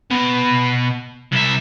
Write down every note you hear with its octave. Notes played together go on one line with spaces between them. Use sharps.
B2 B3
C2 E5